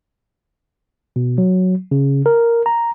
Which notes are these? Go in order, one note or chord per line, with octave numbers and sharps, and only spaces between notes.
B2
F#3
C#3
A#4
A#5